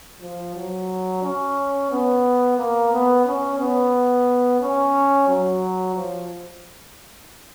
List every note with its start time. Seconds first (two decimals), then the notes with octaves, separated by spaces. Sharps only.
0.21 F3
0.55 F#3
1.23 C#4
1.90 B3
2.57 A#3
2.92 B3
3.25 C#4
3.59 B3
4.61 C#4
5.28 F#3
5.95 F3